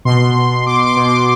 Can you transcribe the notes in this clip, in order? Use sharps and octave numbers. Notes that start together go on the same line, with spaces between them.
B2 C6
B2
B2 D6
D6
B2
D6